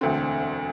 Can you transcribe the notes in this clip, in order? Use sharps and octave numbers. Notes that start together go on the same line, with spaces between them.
E1 D2 D3 C4